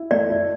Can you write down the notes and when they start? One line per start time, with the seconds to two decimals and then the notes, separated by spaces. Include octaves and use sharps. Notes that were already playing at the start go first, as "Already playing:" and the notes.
Already playing: E4
0.11 A3 D5
0.30 E4